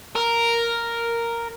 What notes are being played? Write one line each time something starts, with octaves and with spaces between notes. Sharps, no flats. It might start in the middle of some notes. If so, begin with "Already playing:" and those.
A#4